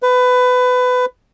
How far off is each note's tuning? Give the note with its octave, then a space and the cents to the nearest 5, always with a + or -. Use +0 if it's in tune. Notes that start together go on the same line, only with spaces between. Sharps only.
B4 +20